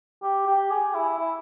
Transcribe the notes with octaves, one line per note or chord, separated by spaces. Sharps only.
G4
G4
G#4
E4
E4